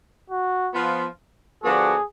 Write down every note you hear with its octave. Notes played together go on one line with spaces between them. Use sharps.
F#4
F3 B3 F4
D3 F3 B3 D4 F#4 G#4